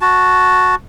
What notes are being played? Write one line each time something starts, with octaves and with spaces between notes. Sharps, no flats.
F#4 A5